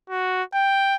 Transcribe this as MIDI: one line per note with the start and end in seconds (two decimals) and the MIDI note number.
0.10 0.43 66
0.54 0.96 79